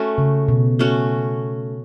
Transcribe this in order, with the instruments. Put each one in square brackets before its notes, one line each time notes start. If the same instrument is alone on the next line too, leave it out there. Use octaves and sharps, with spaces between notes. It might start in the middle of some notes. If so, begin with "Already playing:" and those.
Already playing: [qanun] A3 C#4 F#4
[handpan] C#3
B2
[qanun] A3 C#4 F#4